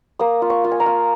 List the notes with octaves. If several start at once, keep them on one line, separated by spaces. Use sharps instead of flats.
A#3 D#6
F4
C#6
F4
G#5
A#5
F4